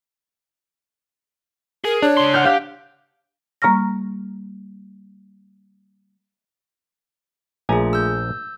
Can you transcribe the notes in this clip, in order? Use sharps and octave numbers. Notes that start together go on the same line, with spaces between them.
G#4 A#4
D4 C#5
C#3 C6
F#5 F6 G6
G4 F5 G6
G3 A#3 A#5 C#6 F6 A#6
A#1 A3 F4 G#4 G#5 A#5
E6 G6